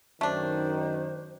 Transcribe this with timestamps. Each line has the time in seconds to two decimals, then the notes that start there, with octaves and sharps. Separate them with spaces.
0.21 F#2 D#3 A3 D4 C5